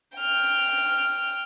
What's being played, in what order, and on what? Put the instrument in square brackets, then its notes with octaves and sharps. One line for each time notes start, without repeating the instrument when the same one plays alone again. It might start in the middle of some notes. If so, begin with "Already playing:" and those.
[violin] G5 F6